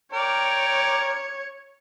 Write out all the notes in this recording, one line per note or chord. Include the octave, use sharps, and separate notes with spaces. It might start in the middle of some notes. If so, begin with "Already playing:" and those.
A#4 C#5 D5 G5